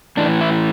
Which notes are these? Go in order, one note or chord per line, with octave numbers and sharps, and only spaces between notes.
A2 E3 D4
E4